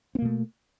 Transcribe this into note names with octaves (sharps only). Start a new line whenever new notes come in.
B2 A3 A#3 C4